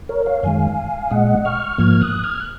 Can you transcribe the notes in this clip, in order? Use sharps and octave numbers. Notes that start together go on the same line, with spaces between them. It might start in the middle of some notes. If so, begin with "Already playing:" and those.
A#4 C#5
C#5 F5
F#2 D#3 G#3 F5 G#5
A#2 G#3 D#5 F#5
C#6 F6
G#2 F3 A#3 F6 G#6
D#6 F#6
F6 G#6
F#6